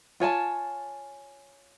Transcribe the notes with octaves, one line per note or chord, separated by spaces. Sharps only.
F4 C#5 G#5 A5